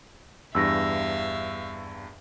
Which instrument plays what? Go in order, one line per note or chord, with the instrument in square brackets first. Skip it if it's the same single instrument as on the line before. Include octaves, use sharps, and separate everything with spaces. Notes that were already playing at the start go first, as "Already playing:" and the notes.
[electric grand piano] E2 G2 [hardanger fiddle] E5 F5 [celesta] E6 A#6